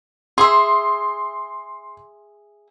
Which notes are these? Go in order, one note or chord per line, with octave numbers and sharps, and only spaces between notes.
G#4 E5 C6